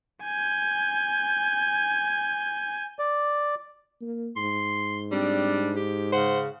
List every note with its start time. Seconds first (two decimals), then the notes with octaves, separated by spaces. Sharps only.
0.24 G#5 G6
2.99 D5
4.01 A#3
4.37 G#2 C6
5.12 G3 C4 D4
5.76 G4
6.12 C#3 C5 F#5